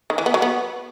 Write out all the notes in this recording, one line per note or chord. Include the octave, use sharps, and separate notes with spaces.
D#3
E3
B3
F#3
B3